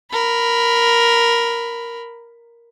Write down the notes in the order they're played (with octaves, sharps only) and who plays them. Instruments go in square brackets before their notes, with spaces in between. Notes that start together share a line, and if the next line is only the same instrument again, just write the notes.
[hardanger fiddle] A#4 B5